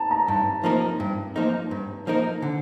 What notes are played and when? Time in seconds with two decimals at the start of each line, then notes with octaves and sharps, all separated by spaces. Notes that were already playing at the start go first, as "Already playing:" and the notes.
Already playing: A5 A#5
0.11 A#5
0.28 G2 A5
0.64 F3 A#3 D#4 A#4
1.00 G2
1.36 F3 A#3 D#4 A#4
1.71 G2
2.07 F3 A#3 D#4 A#4
2.42 D3